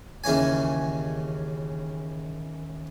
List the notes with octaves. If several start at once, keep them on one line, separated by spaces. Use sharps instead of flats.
D#2 C#3 E3 C#4 G#5